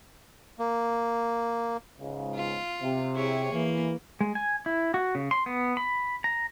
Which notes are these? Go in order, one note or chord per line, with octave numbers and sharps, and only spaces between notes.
A#3
C#2 G#2 C#3
F4
C3
E4 G#4 C#5
E3 A#3
G#3
G#5
E4
F#4
C#3
C6
B3
B5
A#5